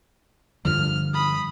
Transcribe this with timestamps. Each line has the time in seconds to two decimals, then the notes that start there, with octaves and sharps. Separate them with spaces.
0.65 G2 D3 F3 F6
1.14 B5 D#6